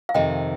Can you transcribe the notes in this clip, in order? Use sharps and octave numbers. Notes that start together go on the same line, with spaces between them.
F5
F2 C3 D#3 D#5 G5